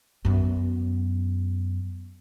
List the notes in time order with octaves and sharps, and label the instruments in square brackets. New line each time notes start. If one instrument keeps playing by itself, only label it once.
[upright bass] F#2 B3